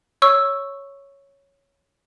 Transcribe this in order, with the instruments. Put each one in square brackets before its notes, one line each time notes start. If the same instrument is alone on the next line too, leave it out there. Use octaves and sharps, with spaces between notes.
[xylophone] C#5 C#6 E6